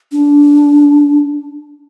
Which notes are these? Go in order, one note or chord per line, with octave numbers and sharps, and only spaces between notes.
D4